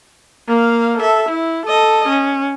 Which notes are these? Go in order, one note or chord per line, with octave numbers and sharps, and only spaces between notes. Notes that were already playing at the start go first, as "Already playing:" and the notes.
A#3 F5
A4 E5
E4
A4 D#5
C#4